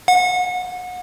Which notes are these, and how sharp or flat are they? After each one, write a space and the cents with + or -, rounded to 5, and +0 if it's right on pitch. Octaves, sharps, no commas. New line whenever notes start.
F#5 -30